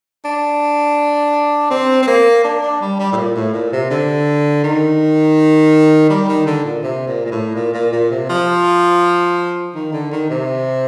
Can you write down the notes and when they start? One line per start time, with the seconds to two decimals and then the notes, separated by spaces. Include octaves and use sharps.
0.25 D4
1.70 C4
2.02 C4
2.07 A#3
2.44 D4
2.63 D4
2.81 G3
2.99 G3
3.12 A2
3.17 A#2
3.35 A2
3.53 A#2
3.72 C3
3.90 D3
4.64 D#3
6.10 G3
6.28 D#3
6.46 D3
6.64 A#2
6.83 C3
7.07 A#2
7.25 A#2
7.31 A2
7.55 A#2
7.74 A#2
7.93 A#2
8.11 C3
8.29 F3
9.75 D#3
9.93 D3
10.12 D#3
10.30 C3